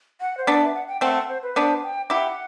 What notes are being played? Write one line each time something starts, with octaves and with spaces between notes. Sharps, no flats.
F#5
C5
B3 D4 D5
E5
F#5
G5
A3 C4 F#5
F#5
C5
B4
B3 D4 C5
G5
E4 G4 F#5